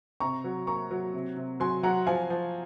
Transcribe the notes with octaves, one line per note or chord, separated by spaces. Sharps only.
C3 A#5 C#6
F#3
A#3 A#5 C#6
F#3
C3
C3
F#3 G#5 C6
F#3 F#5 A#5
F3 F5 G#5
F3